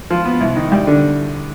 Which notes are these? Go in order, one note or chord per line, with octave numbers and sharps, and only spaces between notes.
F3
B3
C2
D#3
G3
D3